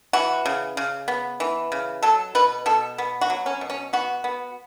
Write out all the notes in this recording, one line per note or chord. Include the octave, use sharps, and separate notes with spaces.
E3 F#4
C#3
C#3
B3
E3
C#3
F#3 A4
B2 B4
B2 A4
B3
F#4
F#3
C#4
B2
C#4
B3 F#4
B3